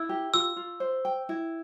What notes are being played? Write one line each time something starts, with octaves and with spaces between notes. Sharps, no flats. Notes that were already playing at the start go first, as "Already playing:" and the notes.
Already playing: E4 E6
G4
F4 E6
F4
C5
G5
E4